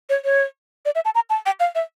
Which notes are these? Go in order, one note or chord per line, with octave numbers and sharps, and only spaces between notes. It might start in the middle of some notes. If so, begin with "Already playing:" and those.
C#5
C#5
D5
E5
A5
A#5
A5
G5
F5
E5